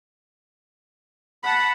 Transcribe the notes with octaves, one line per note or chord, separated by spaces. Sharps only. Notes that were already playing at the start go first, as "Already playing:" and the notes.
F#5 A5 B5